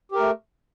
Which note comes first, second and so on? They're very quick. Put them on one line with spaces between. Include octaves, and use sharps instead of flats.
G4 A#4 A3